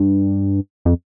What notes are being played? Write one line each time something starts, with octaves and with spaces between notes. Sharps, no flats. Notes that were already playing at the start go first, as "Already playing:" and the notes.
Already playing: G2
F2